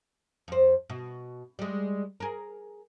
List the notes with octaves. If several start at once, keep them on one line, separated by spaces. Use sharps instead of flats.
F2 C5
B2
G3 G#3
G#4 A#4